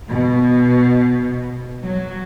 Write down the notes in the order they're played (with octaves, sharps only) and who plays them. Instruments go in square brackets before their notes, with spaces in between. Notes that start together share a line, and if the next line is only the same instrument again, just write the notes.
[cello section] B2
F#3